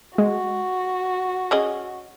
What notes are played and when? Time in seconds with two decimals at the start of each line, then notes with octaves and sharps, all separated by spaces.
0.18 G#3 F#4
1.51 C#4 G#4 D#5